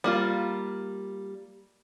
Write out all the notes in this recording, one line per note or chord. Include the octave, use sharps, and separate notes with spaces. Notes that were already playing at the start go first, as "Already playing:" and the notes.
G3 A#3 F4